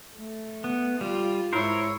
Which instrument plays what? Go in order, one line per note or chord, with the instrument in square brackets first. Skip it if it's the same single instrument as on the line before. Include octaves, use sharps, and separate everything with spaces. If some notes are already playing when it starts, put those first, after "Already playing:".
[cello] A3
[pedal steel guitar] B3
[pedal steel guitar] G3 [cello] F4
[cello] G#2 C#5 [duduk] E4 [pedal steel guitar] A#4 C5